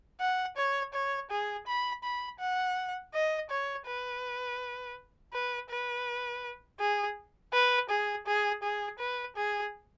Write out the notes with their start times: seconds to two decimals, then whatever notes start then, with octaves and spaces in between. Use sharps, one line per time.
0.20 F#5
0.57 C#5
0.93 C#5
1.30 G#4
1.67 B5
2.03 B5
2.40 F#5
3.14 D#5
3.50 C#5
3.86 B4
5.33 B4
5.70 B4
6.80 G#4
7.53 B4
7.90 G#4
8.27 G#4
8.63 G#4
8.99 B4
9.36 G#4